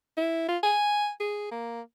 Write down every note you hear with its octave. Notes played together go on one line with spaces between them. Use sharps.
E4
F4
G#5
G#4
A#3